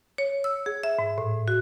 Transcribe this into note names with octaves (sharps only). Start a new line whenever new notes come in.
C#5
E6
G#4
E5
G#2
A2
F#4